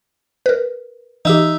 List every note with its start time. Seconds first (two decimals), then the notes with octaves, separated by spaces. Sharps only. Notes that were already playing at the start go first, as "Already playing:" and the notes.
0.46 A#4 B4
1.25 E3 D#4 G4 E5